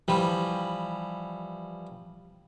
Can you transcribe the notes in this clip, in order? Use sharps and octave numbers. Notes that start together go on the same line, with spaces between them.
E3 F3 G3